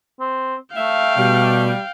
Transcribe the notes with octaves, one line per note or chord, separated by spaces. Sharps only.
C4
A3 E5 F5 G5
B2 G3